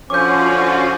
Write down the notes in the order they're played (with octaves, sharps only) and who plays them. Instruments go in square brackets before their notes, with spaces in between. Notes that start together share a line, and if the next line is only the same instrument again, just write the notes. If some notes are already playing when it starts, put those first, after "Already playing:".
[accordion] D3 F3 C#4 [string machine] F4 F#4 [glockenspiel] D6 G6